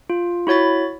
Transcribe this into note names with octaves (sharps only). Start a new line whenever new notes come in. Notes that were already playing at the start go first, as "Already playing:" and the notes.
F4
E4 F#4 C#5 B5 A6